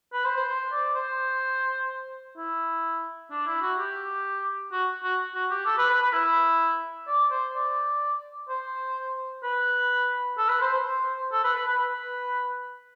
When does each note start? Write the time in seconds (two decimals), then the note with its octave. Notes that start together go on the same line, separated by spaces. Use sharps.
0.13 B4
0.25 C5
0.36 C5
0.48 C5
0.72 D5
0.95 C5
2.37 E4
3.31 D4
3.46 E4
3.62 F#4
3.78 G4
4.72 F#4
5.04 F#4
5.35 F#4
5.51 G4
5.66 A4
5.78 B4
5.90 B4
6.02 B4
6.13 E4
7.08 D5
7.31 C5
7.55 D5
8.49 C5
9.43 B4
10.38 A4
10.49 B4
10.61 C5
10.73 C5
11.32 A4
11.44 B4
11.56 B4
11.67 B4
11.79 B4